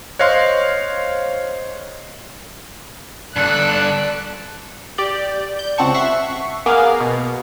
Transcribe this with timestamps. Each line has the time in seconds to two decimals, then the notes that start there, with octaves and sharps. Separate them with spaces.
0.19 C5 C#5 D#5 F5 C6 F#6
3.36 G2 A4 D5 F#6
4.98 G4 D5 G6
5.59 G6
5.78 C#2 C4 F#5 A5 C#6
5.94 E5 F#5 C#6 C7
6.66 A#3 B3 G#4 A#4 F5
7.01 B2